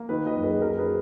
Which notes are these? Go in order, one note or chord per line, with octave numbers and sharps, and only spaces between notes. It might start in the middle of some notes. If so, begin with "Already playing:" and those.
Already playing: A#3
D#3 B4 D#5
B4 D#5
F#2
G#4 B4
F#3 A#4
G#4 B4